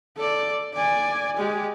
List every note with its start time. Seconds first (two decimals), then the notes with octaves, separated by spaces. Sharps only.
0.17 A4 D5
0.74 D5 G#5
1.37 G#3 G4